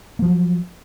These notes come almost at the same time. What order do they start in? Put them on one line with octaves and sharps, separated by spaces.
A#3 F3 F#3